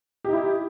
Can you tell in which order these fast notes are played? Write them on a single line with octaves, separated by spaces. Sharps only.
G4 D#4 E4